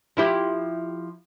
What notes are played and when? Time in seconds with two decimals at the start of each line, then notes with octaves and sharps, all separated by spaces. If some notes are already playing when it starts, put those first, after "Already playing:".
0.17 F3 E4 G4